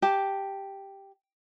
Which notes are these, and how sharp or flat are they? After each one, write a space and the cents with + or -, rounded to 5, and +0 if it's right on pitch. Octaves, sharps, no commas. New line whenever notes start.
G4 +0 A5 +0